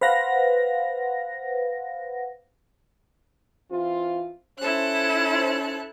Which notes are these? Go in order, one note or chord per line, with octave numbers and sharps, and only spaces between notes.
B4 C5 F5 F#5 A#6
E3 C4 F4
C#4 E4 A4 C5 F#6